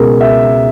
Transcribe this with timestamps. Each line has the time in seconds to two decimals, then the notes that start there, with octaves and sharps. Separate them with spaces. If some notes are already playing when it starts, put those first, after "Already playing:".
Already playing: C#2 B2 G#4 A#4
0.21 E5